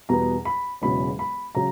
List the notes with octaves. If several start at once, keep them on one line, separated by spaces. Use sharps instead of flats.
E2 B2 G3 B3 A#5
B5
E1 E2 C#3 F#3 B5
B5
C#3 F#3 A#5